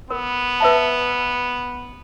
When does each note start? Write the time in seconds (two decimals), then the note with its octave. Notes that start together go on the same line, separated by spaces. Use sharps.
0.10 B3 A#4
0.60 B4 E5 A5